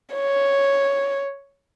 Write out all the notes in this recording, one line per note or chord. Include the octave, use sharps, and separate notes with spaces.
C#5